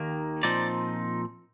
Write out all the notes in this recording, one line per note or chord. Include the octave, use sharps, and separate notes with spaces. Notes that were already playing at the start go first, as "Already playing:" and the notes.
Already playing: D#2 D#3 A#3
A#2 F3 C4 D#4 D5